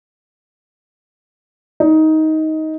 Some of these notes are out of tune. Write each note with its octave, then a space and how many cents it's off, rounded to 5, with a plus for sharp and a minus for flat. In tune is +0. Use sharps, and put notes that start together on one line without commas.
D#4 +15